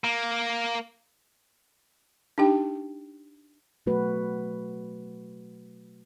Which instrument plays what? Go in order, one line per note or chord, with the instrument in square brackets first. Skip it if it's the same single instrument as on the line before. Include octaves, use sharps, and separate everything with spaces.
[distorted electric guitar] A#3
[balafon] D4 D#4 G4 G5
[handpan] B2 F#3 A3 F#4 B4